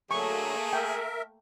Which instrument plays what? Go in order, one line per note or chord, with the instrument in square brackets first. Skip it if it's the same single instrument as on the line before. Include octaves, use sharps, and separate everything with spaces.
[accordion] D3 F#3 [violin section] A3 A#3 [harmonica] G#4 [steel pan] C#6
[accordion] A#4 E5 [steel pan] G5